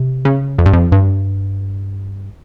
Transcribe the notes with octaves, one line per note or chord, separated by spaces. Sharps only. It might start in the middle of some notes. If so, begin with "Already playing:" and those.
Already playing: C3
C#3
F2
G2
F2
G2